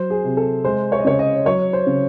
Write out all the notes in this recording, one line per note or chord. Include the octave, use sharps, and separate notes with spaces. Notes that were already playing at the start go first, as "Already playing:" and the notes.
Already playing: F#3 C5
G#4
C3
A4
G#3 C5
C#5
D#5
C#3 C#5
D#5
F#3 C#5
C5
C#3